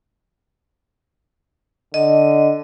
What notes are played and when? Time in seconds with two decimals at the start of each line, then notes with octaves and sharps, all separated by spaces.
1.94 D3 D#5